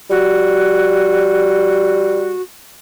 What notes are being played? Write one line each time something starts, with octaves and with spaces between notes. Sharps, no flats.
G3 F#4